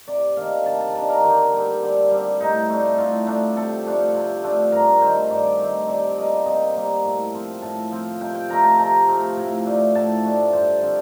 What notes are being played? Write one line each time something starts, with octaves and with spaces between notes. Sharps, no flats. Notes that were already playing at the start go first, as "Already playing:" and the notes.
C3 D5
D#3 A#3 D4 F5
C3 A5
A5
D#3 A#3 D4 A5
A#4
D3 G4
G3 C4
D3
G3 C4
A2 D#4
A3 D4
A2 F4
A3 D4
C3 A4
F3 A3 D4
C3
F3 A3 D4
G2 A#4
D#3 A3 C4 C5
G2 D5
D#3 A3 C4
C3 D5
G3 A#3 D#5
C3 D#5
G3 A#3
A2
F3 C4
A2 A5
F3 C4
C3 G5
G5
F3 A3 A#5
A5
C3 A#5
F3 A3
A2
A3 D4
A2 A5
A3 D4
G2 C5
D3 F3 C4